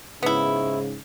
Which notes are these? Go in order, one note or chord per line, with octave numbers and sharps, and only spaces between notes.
G#2 C#3 B3 E4